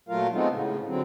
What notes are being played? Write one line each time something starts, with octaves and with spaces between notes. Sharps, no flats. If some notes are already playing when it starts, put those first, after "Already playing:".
A#2 F#3 A3 F4 A#4 F5
G#3 A3 B3 C4 D#4 F4
A2 C#3
D3 F#3 C4